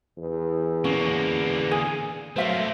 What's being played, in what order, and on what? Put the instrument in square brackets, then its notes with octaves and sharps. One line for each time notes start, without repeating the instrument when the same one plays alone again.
[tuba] E2
[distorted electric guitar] D3 A#3 [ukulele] C#4
[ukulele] G#4
[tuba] F#3 [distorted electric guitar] A3 A#3 [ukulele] C5 E5 F5